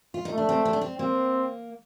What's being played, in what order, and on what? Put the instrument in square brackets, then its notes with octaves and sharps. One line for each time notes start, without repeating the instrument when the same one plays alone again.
[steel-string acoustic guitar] F4
D#4
[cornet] A3
[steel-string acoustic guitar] D4
C4
C4
D4
C4
[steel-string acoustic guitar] A#3 [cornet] C4